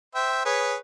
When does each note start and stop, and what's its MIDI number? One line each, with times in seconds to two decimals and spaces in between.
0.15 0.44 72
0.15 0.44 76
0.15 0.44 79
0.45 0.75 68
0.45 0.75 71
0.45 0.75 73